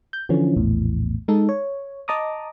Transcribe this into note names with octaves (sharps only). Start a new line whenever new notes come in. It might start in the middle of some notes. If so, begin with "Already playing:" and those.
G6
D3 E3 F3 C#4
A#1 E2 A2
G#3 D#4 A4
C#5
D#5 A5 A#5 D6 D#6